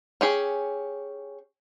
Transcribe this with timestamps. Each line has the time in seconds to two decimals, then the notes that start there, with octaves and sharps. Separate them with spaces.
0.21 C#4 G4 G#4